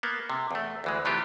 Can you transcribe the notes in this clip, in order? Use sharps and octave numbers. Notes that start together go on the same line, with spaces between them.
A#3 B3
C3
E2 A3
D2 E3 G#3
C3 E3 A3 C#4 F4 G4